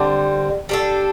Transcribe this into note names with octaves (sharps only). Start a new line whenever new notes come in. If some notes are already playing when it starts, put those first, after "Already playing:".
Already playing: D3 G3 C4
G3 D4 A4